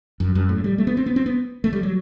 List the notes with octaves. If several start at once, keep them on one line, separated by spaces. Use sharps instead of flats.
F#2
F#2
A2
G3
A3
B3
C4
B3
C4
B3
A3
G3
F#3